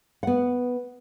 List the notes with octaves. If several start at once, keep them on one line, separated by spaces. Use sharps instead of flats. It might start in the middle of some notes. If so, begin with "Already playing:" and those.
B3 F#5